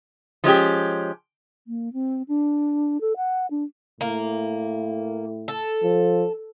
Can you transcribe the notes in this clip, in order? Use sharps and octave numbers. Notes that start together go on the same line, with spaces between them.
F3 G#3 C#4 G4
A#3
C4
D4
A4
F#5
D4
A2 A#3
A4
F3